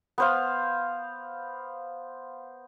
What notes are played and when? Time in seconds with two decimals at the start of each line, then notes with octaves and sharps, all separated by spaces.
0.18 B3 C5 F5